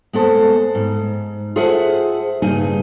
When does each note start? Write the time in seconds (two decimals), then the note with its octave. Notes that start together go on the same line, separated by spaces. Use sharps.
0.13 G#3 B3 A4 C5
0.75 G#2
1.56 F4 G#4 A4 C5 E5 F#5
2.42 G2 C#3 D#4 G#4 G#5